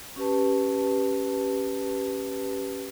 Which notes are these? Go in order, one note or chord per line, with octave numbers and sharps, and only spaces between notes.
C#4 G4 B4 A5